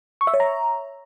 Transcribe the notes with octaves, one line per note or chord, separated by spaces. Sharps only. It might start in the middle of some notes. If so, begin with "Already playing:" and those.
C#6
E5
C#5
A#5